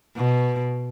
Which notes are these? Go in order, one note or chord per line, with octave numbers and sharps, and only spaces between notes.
B2